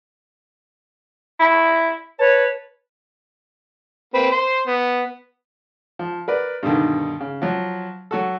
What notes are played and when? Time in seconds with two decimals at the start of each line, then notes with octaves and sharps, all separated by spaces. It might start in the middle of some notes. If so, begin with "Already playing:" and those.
1.40 E4
2.19 B4 C#5 A5
4.14 A#3 C4 B4
4.32 C5 C6
4.67 B3
5.99 F3
6.28 A#4 B4 D5
6.63 G2 B2 D3 D#3
7.20 C#3
7.42 F3 F#3
8.11 F#3 F#4 A4